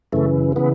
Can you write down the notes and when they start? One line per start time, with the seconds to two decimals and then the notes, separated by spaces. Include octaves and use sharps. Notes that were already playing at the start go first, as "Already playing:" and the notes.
0.12 F#2 C#3 E3 A3
0.56 C#3 E3 B3